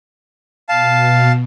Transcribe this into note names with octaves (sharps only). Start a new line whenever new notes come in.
B2 F5 A5